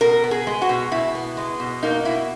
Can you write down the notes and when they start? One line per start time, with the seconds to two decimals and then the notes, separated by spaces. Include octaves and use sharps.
0.01 B2 A#4
0.24 B3
0.31 G#4
0.47 G#3
0.62 F#4
0.69 B2
0.92 B2 E4
1.15 B3
1.37 G#3
1.60 B2
1.83 A#3 D#4
2.05 B2 E4